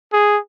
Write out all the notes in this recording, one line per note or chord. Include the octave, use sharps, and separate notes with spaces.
G#4